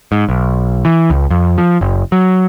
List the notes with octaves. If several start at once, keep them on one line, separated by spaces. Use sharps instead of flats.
G#2
B1
E3
C#2
F2
F3
F#1
F#3